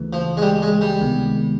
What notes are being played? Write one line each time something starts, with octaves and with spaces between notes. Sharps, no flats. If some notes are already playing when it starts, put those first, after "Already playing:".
Already playing: D2 C#3 E3 A3
F3
G#3
G3
G#3
G3
C#2 C3 D#3 G#3 B3